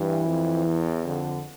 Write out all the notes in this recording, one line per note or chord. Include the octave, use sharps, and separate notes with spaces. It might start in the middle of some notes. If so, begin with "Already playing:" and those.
Already playing: G2 E3
F2
E2
F2 D3